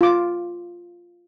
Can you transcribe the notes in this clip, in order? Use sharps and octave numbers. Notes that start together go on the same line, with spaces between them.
F4 D6